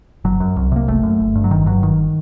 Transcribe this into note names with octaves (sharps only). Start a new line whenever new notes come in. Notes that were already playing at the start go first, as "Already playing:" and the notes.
G1 F#3
F#2
C2
C3 A#3
F#1 A3
F#2
G1
G2
F#3
G1 D#3
G2 F#3
G1 D#3